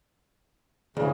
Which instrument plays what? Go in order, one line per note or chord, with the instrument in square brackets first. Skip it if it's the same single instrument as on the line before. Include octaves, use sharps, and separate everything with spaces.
[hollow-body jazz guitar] D2 [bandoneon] G2 C#3 E3 [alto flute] G#4